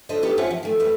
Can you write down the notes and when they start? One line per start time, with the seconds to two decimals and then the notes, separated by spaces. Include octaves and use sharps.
0.09 D3 F3 A4 B4 C5 D#5
0.22 B3 D#4 G4 A4
0.37 C4 C#4 F4 G#4 E5 F#5
0.51 F3
0.63 D#3 A3
0.80 F2 A3 B4